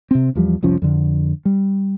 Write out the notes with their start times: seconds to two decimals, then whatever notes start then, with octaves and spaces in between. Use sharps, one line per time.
0.11 C3 C4
0.35 E2 F3 G3
0.63 F1 C2 F3 C#4
0.82 F2 D3
1.45 G3